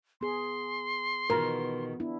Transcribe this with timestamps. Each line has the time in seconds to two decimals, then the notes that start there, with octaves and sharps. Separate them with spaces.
0.21 B3 G#4 C6
1.30 B2 D#3 E3 B3 F4 A#4
2.00 B3 D4 E4